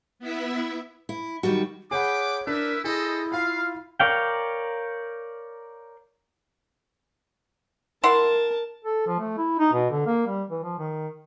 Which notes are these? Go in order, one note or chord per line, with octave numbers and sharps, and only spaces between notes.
B3 E4 E5
E4
D#3 F#3 G3 F#4
G#4 B4 C#5 F#5 G5 B5 D6
D4 E4 A#4 B4 E5
E4 G#4 A4 C5 D#5
F4 F5 B5
A#4 C#5 D5 F5 G5
E4 A#4 F#5 A5 C6
A4
F3
A3
E4
D#4
B2
D3
A#3
G3
E3
F3
D#3